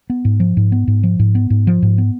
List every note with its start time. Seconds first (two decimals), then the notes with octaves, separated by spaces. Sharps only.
0.10 B3
0.25 G#2
0.40 F3
0.57 G#2
0.72 B3
0.88 G#2
1.03 F3
1.19 G#2
1.35 B3
1.50 G#2
1.67 F3
1.82 G#2
1.98 B3